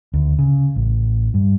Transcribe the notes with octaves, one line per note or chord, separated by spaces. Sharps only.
D2
C#3
A1
G2